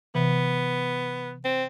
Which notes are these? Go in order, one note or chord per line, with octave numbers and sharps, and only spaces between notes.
C3 E3 B3
C4